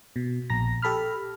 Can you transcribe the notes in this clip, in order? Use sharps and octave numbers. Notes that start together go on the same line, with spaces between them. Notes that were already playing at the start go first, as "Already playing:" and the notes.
B2
A#1 A#5 A#6
G4 A4 B5 F6